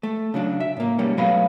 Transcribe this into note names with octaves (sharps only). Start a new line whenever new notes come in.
A3
C#3 F#3 D4
E5
A2 A#3
G#2 B2 G3 A#3 C#4
B1 F#3 A3 B3 F5 B5